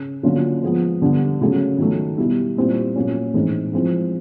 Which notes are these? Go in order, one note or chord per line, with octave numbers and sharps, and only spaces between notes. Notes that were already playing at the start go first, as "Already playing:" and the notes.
Already playing: C#3 C#4
D3 F#3 A#3 C#4 F4
F3 G#3 B3
D3 G3 B3
C#3 F#3 A3
D#3 F#3 A3
B2 G3 B3 E4
A#2 G3 C4 E4
A#2 F#3 A#3 C#4
A2 E3 G#3 C4 D#4
F3 G#3 C4 E4